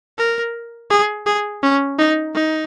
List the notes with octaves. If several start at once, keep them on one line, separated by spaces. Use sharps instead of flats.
A#4
G#4
G#4
C#4
D#4
D#4